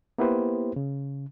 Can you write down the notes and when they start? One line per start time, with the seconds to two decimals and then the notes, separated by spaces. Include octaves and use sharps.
0.18 A#3 B3 E4 G4 B4 C5
0.76 C#3